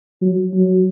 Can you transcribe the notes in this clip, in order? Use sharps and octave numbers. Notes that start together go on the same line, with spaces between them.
F#3
F#3